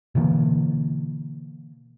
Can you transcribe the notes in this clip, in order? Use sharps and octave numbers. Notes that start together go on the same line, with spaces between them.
B2 D3 E3 A#3